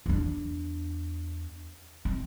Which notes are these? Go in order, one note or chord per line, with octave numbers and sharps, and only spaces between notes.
E2 D4
C4